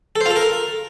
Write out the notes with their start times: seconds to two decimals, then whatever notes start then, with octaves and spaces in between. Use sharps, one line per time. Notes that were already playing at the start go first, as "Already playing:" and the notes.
0.16 A4
0.21 C5
0.26 F4
0.31 A4
0.36 A#4